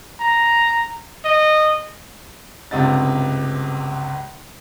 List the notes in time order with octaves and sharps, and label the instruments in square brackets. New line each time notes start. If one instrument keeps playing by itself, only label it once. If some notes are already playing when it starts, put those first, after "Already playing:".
[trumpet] A#5
D#5
[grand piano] G1 C#2 C3 D#5 A6